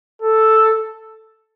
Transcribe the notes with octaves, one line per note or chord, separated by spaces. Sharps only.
A4